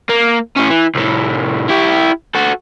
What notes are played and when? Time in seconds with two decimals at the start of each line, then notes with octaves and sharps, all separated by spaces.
0.09 A#3
0.56 A2 C#4
0.70 E3
0.95 C2 A2
1.69 E4 G4
2.35 F#4 A4